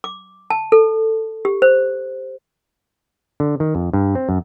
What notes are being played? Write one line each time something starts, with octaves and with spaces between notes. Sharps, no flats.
D6
A5
A4
G4
C5
D3
D#3
F2
G2
C4
F#2